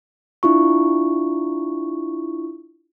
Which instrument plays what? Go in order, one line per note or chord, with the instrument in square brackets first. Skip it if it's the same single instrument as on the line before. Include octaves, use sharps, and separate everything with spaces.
[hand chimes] D4 E4 F4 C#6